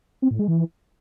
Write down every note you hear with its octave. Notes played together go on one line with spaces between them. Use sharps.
C4
A2
G#3
E3